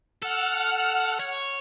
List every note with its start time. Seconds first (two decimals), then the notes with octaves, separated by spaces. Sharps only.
0.23 A4 F#5 F6
1.20 C#5